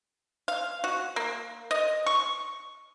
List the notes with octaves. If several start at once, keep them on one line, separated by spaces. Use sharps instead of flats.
F5
F#4
A#3
D#5
C#6